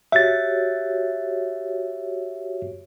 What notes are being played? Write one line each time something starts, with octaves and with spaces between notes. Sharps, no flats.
F#4 G4 C#5 E5 A6